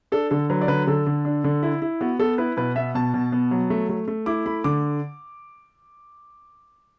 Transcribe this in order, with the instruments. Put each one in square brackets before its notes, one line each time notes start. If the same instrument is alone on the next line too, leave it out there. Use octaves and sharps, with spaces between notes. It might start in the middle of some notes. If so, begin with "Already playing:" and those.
[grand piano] D4 A4
D3 A4
F#3 B4
D5
D3 B4
D3 A4
D3
D4
D3
E4
E4
B3 F#4
B3 A4
E4 B4
B2 B4
B3 E5
B2 A5
B2
B3
F#3
A3
A3
A3
E4 D6
A3 B5
D3 D6